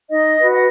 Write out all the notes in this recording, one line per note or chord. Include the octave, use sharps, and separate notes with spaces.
D#4 D#5
F#4 B4
F#5